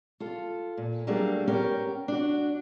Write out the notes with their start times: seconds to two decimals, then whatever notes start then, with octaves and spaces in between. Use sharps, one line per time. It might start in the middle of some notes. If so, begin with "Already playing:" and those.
0.20 F4 A4
0.77 A#2
1.07 F#3 G3 A3 A#3 D4 G#4
1.47 B3 C#4 G4 A#4 G5
2.08 D4 F#4